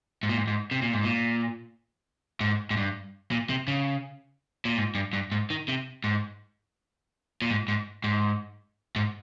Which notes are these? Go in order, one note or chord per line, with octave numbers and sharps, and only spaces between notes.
G#2
A#2
G#2
G#2
C3
A#2
G#2
A#2
G#2
G#2
G2
A#2
C3
C#3
A#2
G#2
G2
G2
G#2
D#3
C3
G#2
A#2
G#2
G#2
G#2
G#2